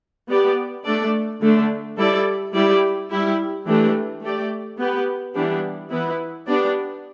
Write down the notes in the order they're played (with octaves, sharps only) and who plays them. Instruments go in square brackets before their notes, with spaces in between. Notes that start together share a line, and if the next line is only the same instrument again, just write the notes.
[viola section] B3 G4 D5
A3 D4 A4 D5
D3 A3 D4
G3 E4 A4 D5
G3 E4 G4 D5
G3 E4 G4
E3 A3 D4 G4
A3 G4 D5
B3 G4 B4
E3 G3 B3 D4 G4
E3 B3 E4 B4
B3 D4 G4 D5